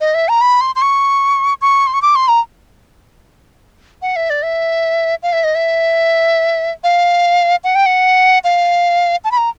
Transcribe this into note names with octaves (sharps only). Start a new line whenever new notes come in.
D#5
E5
A#5
B5
C6
C6
C#6
C#6
C6
C#6
D6
C6
A#5
F#5
E5
D5
E5
F5
E5
D#5
E5
F5
F#5
G5
F#5
F5
A5
B5
A#5